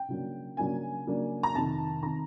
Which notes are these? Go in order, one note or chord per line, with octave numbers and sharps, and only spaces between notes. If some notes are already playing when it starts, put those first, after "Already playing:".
Already playing: G5
C#3 F#3 A#3 D4
C#3 F#3 A#3 D4 G#5
C#3 F#3 A#3 D4
A#5
F2 C3 D#3 A5
C3 D#3 A#5